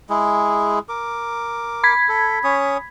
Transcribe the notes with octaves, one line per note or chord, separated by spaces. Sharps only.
G#3 E4 G#4
A#4 D6
B5 G#6 B6
A4
C#4 C#5 D#6